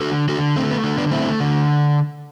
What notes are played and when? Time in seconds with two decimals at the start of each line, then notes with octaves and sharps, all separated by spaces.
0.01 D3 F#4 A4
0.29 D3 F#4 A4
0.56 A3 C4
0.71 B3
0.84 D3
0.98 B3 D4
1.11 A3 C4 E4
1.40 D3